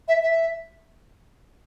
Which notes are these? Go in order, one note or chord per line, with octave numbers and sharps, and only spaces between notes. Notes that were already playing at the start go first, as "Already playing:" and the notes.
E5
E5